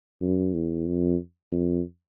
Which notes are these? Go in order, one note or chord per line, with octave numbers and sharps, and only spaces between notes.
F#2
E2
F2
F2